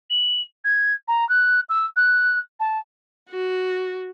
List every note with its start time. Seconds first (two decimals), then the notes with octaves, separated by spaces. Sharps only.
0.10 F#7
0.64 G#6
1.08 A#5
1.29 F#6
1.69 E6
1.96 F#6
2.60 A5
3.30 F#4